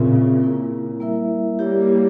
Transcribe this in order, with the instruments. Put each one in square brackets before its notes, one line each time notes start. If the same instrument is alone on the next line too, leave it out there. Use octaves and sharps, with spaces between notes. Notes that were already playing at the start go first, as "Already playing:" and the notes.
Already playing: [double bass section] A#2 C#3 [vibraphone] C4 F4 A#4 E5
[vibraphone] A#3 E4 A#4
G3 A#3 E4 A#4 E5
[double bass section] G3 A#3 [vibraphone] E4 G4 C#5